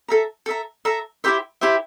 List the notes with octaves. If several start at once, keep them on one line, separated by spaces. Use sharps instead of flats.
A4 E5 A#5
A4 E5 A#5
A4 E5 A#5
E4 G4 C5 E5
E4 G4 C5 E5